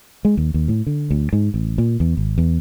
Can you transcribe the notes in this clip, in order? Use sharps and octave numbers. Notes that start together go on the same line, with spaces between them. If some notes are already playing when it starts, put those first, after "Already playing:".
G#3
D#2
D#2
A2
D3
D2
G#2
A1
A#2
E2
G#1
E2